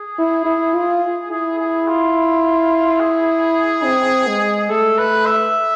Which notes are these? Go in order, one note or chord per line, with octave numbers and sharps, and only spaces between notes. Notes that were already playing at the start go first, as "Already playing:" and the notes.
Already playing: G#4
E4
E4
F4
E4 G#4
G#4
F4
G#4
C4
G#3
A3 A4
B4
E5